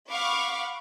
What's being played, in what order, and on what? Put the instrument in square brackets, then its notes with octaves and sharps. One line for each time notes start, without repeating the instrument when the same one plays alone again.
[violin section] F5 F#5 B5 C#6 D6